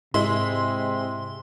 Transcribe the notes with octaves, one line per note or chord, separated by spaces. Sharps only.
G#2 C3 G#3 E4 C6